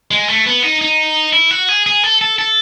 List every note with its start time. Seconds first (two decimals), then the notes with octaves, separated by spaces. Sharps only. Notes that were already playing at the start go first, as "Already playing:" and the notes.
0.11 G#3
0.28 A3
0.46 B3
0.63 D#4
0.81 D#4
1.33 E4
1.51 F#4
1.69 G#4
1.86 G#4
2.03 A4
2.21 A4
2.39 A4